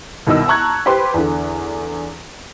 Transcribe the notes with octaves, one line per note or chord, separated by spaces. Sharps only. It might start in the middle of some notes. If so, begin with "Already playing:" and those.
C2 B2 D#3 D#5 E6
A5 A#5 C#6 F#6 G#6
G4 B4 C5 C6
E2 D3